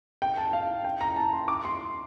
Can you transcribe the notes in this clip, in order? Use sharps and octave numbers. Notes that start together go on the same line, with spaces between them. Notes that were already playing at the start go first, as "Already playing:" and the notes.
G5
A5
F5
G5
A#5
A5
C6
D6
C6